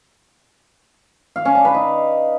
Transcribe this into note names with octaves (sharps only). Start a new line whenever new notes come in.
F5
C#4
D4
B4
D#4